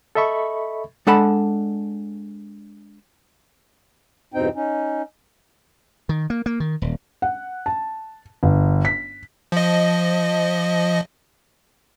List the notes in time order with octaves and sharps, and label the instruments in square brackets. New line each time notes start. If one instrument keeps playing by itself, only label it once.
[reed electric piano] A4 D#5 E5 B5 C#6
[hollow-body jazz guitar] G#3 D4 A4 F#5 A5 B5
[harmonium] E2 G2 B2 C4 D#4 G5
C#4 D#4
[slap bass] D#3
A#3
A#3
D#3
D#1
[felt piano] F#5
A5
G1
B6
[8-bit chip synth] F3 D#5